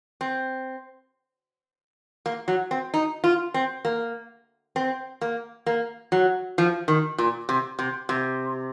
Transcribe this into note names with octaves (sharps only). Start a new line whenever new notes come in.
C4
A#3
F#3
C4
D#4
F4
C4
A#3
C4
A#3
A#3
F#3
F3
D#3
A#2
C3
C3
C3